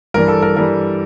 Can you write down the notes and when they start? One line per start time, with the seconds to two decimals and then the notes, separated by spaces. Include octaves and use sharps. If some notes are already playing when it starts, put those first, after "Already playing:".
0.14 G2 E3 G3 A#4
0.28 A4
0.42 A#4
0.56 E3 G3 A#4